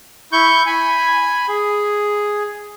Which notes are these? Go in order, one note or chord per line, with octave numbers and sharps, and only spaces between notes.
E4 C#6 G6
G#5 B5
G#4